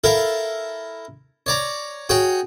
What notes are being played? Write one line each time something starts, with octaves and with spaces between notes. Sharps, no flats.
E4 A4 A#4 F5
C#5 D5 A#5
F#4 G#4 C#5 G5